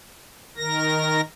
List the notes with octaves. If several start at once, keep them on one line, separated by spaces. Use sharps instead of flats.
D#3 A#4 A#6